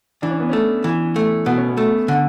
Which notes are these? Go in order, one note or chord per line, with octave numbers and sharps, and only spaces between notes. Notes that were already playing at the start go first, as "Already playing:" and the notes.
E3 D4
C#4
B3
A3 C#4
E3
A3
B2 B3
C#4
B3
A3
D3